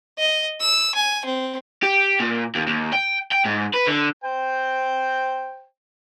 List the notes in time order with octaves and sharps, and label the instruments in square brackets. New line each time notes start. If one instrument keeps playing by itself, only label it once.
[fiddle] D#5
E6
G#5
C4
[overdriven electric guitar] G4
A#2
D#2
D#2
G5
G5
G#2
B4
D3
[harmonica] C5 G5